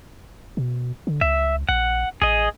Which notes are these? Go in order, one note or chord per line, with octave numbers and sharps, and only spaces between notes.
B2
D3
C#2 E5
A#1 F#5
A1 G#4 D#5